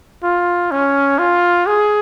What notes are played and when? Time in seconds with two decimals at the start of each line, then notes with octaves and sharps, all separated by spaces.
0.23 F4
0.71 C#4
1.19 F4
1.67 G#4